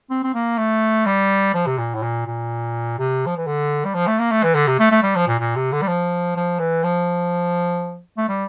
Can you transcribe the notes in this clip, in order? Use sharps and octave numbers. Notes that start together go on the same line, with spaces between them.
C4
C4
A#3
A3
G3
F3
C3
A#2
A2
A#2
A#2
C3
F3
E3
D3
G3
F3
A3
A#3
A3
E3
D3
C3
A3
A3
G3
F3
A#2
A#2
C3
D3
G3
F3
F3
E3
F3
A3
G3